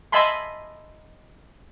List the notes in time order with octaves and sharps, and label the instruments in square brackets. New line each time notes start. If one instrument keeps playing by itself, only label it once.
[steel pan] D#5 E5 G#5 A5 B5 C6